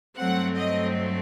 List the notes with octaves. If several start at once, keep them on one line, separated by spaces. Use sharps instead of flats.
G2 F#3 A3 C4 F#5
D#5